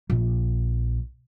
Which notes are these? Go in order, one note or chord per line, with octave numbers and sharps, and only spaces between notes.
A#1